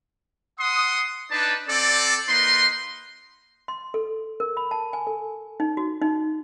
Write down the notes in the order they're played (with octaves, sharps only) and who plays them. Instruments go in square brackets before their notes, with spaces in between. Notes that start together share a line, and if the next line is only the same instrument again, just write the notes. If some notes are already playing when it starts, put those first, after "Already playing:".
[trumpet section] F#5 C6 D#6
D4 D#4 B4 D5 A5
C4 A4 D5
A#3 D#4 B4 C6
[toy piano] C6
A4
A#4
B5
A5
G#5
A4
D#4
F#4
D#4